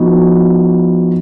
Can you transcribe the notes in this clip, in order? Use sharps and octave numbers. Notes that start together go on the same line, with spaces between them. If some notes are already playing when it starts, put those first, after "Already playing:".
Already playing: F3 B3 D#4 F#4